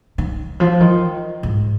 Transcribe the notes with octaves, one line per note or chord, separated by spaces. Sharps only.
D#3
F3
D#3
G#2